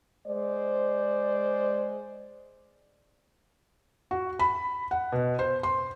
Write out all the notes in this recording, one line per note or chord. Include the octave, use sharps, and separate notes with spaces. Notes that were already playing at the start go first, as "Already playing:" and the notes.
G#3 C5 D5
F#4
B5
F#5
B2
C5
C6